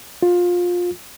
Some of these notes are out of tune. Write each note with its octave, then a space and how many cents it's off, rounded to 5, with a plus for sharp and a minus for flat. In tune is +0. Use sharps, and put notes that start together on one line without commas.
F4 +20